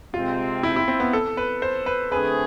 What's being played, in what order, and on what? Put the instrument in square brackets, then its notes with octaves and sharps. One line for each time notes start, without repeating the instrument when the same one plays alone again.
[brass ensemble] C3 G#3 C4 [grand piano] F4
[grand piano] E4
E4
C4
B3
A4
B4
C5
B4
[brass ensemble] D3 A3 C4 G#4 [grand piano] B4